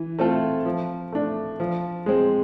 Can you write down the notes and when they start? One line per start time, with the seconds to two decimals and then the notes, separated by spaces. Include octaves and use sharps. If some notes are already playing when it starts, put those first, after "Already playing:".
Already playing: E3
0.19 A3 C4 F4 A4
0.65 F3
1.12 A3 D4
1.60 F3
2.06 G#3 C4